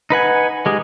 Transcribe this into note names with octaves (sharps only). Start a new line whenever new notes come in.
D#4 B4 F#5 G#5
G#3 G4 G#4